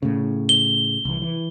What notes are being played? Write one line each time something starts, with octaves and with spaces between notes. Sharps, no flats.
A2 C#3
G7
C2 E3
E3